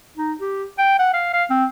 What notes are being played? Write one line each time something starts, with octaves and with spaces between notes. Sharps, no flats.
D#4
G4
G5
F#5
F5
F5
C4